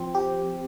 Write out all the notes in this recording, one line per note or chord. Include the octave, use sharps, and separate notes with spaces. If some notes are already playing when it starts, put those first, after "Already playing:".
Already playing: F3 C4
G4